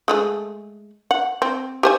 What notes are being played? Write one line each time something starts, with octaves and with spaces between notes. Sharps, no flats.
G#3 A3 G#4
F#5
C4
G4 C5 G#5